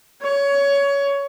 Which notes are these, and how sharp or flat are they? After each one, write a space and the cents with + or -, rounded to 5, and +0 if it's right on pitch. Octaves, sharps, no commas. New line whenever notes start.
C#5 +20